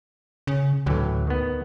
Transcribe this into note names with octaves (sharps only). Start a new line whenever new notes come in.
C#3
D2 A2 E3 F#3
D#3 B3